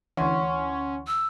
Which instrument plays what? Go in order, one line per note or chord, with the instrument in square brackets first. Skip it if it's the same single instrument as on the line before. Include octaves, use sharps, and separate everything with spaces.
[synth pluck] D2 E3 [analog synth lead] C#4 [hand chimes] F#5 C6 C#6
[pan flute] E6